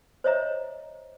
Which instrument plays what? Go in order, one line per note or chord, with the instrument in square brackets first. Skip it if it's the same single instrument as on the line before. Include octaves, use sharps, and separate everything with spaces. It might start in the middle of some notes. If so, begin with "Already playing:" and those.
[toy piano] C5 C#5 D#5 E5 A#5